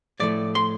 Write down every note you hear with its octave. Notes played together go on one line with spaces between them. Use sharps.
A2 F3 A3 D5
C6